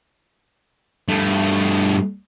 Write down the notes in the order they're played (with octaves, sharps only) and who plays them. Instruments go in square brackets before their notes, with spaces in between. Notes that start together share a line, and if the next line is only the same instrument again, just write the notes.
[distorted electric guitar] G2 A3